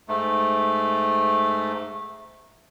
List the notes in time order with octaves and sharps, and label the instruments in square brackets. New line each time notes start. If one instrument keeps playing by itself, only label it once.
[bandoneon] G#2 A3